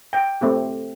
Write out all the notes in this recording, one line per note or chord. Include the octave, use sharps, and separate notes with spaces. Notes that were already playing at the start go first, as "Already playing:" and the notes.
G5
A3 C4 G4